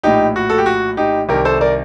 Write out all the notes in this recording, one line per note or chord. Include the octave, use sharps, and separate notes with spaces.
A#1 A2 D#4 G4
F#4
A4
G4
F#4
D#4 G4
C2 C3 D#3 G4 A#4
A4 C5
A#4 D5